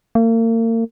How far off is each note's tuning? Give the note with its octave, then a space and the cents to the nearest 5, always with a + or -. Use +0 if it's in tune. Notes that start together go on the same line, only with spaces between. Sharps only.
A#3 -40